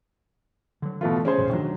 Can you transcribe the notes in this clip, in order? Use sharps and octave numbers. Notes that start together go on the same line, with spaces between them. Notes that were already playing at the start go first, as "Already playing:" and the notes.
D3 F#3
B2 E3 A3 F4
C#4 G#4 C5
B1 F#2 A#2
D#3 F#3 D4